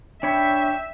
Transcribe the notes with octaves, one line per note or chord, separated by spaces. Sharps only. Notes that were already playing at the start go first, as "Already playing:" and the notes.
D4 C#5 E5 G5 B5